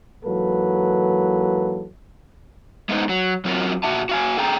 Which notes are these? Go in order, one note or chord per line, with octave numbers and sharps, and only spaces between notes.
G#2 E3 F#3 A#3 A4 B4
G#3 A3 B3 D#4 C5
F#3
F#3 C4 F4 F#4 G#4 A#4
A#2 F#4 E5 A5
F#4 F5 G#5
G#4 A4 G5 A#5